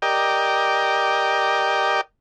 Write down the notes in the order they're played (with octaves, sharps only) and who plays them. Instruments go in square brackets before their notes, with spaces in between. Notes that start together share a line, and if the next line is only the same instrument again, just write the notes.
[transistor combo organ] G4 A#4 D5 D#5 G5